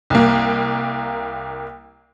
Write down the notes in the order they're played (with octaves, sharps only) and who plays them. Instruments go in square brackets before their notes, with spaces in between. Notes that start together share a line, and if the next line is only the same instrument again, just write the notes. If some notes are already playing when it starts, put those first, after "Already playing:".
[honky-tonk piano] C2 A#3